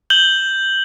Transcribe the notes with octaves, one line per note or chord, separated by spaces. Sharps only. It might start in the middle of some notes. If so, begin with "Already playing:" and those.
G6 F#7 G7